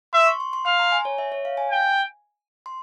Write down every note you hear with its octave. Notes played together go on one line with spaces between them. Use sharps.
E5 C6
C#6
C6
C6
F5 C6
A#5
G#5
C#5
E5
C#5
F5
G#5
G5
C6